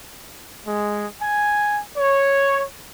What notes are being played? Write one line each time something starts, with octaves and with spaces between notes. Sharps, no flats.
G#3
G#5
C#5